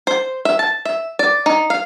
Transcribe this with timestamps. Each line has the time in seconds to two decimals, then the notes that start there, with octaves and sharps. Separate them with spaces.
0.07 C5
0.45 E5
0.59 A5
0.85 E5
1.19 D5
1.46 D#4
1.70 F5